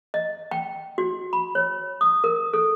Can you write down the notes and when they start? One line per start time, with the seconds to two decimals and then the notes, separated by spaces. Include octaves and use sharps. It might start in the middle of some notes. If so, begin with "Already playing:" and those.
0.14 D#5
0.51 G5
0.98 F#4
1.33 B5
1.55 C#5
2.01 D#6
2.24 A#4
2.54 A4